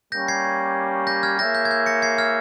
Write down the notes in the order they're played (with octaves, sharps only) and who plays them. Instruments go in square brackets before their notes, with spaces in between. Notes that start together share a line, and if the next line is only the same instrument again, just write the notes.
[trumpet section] G3 A#3 C#4 G4 C#5 [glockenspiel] G6 A#6
[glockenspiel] G#6 C7
G6 A#6
F6 G#6
[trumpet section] A#3 E4 G#4 C#5 E5 [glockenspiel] G6 A#6
[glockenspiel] G6
G#6
G6
A#6 C#7
G#6 C7
F6 G#6